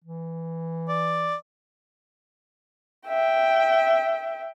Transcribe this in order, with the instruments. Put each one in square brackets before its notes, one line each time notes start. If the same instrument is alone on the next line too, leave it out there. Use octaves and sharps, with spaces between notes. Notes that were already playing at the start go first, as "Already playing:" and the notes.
[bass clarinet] E3
[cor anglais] D5
[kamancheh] E5 G5